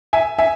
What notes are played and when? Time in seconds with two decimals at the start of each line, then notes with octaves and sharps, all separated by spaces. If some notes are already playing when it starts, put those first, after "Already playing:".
0.13 E5 G#5
0.38 E5 G#5